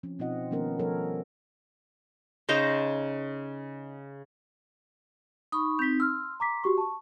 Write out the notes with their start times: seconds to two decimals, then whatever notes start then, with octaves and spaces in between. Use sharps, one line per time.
0.03 F3 C4 C#4
0.19 B2 C4 D#4 F4 D#5 F#5
0.51 D#3 F3 A3 B3 C#4 A#4
0.79 F3 G3 A4 A#4 C#5
2.49 C#3 D#4 C5 A#5
5.52 D#4 B5 C#6 D#6
5.79 C4 D#4 G6 B6
6.00 C6 E6 F6
6.40 A#5 D6 B6
6.64 F#4 G4 C#6
6.78 A5 C#6